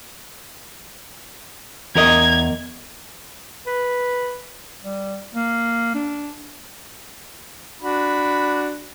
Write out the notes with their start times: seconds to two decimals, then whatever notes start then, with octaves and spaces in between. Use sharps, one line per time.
1.95 E2 A#4 D#5 G#6
3.67 B4
4.84 G3
5.34 A#3
5.94 D4
7.81 D4 F#4 B5